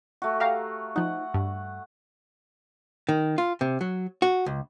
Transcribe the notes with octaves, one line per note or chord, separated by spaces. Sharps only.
A3 F#4
G4 F5 A#5
F3 D#4 F#5
G2
D#3
F4
C3
F#3
F#4
C#2